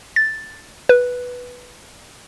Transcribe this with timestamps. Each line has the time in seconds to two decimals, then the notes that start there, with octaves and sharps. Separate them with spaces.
0.16 A6
0.89 B4